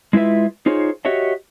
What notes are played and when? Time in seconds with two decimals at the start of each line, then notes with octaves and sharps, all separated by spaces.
0.13 G#3 E4 F4 B4 E5
0.66 D#4 F4 G#4 C5 C#5
1.05 F#4 G4 C#5 D#5 E5